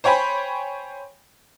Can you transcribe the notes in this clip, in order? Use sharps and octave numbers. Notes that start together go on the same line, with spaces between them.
C5 C#5 G5 G#5 B5